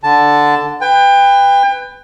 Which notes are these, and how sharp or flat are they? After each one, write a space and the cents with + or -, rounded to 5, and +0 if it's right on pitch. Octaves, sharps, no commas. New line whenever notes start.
D3 +0 A5 +0
B4 +15 G5 +30